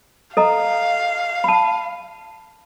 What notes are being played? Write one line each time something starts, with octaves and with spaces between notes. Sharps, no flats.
A4 D#5 F5 A#5
A5 B5